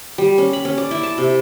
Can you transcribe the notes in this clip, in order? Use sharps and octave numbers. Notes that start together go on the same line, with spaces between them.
G3
C#4
B5
C#4
D5
E4
A5
C3